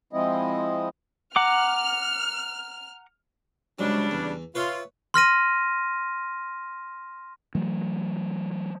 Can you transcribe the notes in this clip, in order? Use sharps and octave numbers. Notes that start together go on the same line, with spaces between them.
F3 G#3 C4 E4 D#5
F#5 A#5 D6 F6
G#2 C#3 F#3 G3 D4
E2
F4 B4 C#5 E5
C6 F6 A#6 D#7
E3 F#3 A3